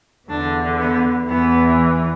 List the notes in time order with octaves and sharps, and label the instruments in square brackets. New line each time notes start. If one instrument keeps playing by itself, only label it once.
[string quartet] E2 D3 D4
B3
E2 E3 B3